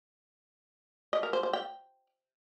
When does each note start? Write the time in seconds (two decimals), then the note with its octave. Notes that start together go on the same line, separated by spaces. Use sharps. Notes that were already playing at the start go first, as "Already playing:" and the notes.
1.13 D#5
1.23 A#4
1.33 C5
1.43 C5
1.53 G5